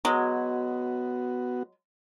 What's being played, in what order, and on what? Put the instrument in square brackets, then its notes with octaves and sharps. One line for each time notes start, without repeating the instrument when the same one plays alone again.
[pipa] F#3 G#3 [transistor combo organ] B3 F#4